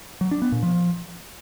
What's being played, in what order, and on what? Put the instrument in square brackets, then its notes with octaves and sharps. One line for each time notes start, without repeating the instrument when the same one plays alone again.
[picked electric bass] F#3
D4
B3
A#2
F3